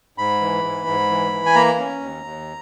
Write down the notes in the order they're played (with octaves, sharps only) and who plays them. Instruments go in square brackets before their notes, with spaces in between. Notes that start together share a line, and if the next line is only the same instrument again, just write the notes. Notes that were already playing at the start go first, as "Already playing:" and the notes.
[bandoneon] G#2 B5
E3
G#2
G#2
E3
E3
G#5
A#3 A#5
C#4
D#2
D#2